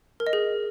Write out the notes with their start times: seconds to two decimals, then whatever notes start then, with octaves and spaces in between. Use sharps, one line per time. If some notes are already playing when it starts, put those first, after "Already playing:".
0.20 A#4
0.27 D#5
0.33 G#4